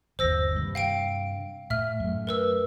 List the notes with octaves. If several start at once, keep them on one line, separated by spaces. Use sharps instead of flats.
G1 D#2 C5 E6 A#6
G2 C3
F5 G5 D7
A2 E5 F6
F#2 A3
A#4 B4 E6